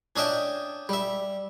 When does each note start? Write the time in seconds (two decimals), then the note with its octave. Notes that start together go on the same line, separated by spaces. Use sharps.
0.16 C#4 D4 D#5 E5 G5
0.89 G3 E5